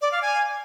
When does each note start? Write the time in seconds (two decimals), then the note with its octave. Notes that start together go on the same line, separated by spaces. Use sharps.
0.01 D5
0.12 F5
0.22 G#5